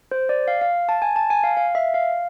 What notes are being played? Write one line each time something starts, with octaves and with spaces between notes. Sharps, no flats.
C5
D5
F5
F5
A5
G#5
A5
G#5
F5
F5
E5
F5